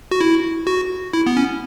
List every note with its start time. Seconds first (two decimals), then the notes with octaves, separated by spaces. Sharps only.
0.11 F#4
0.21 E4
0.67 F#4
1.13 E4
1.26 B3
1.37 C#4